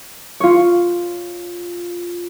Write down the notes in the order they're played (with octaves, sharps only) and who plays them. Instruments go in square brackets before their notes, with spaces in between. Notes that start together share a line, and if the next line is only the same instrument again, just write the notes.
[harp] F4 C#5